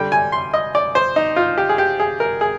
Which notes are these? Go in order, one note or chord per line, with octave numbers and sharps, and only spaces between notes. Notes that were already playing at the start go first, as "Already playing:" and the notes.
Already playing: D3 G3 D4 G5
G#5
C6
D#5
D5
C5
D#4
F4
G4
G#4
G4
G#4
A#4
G#4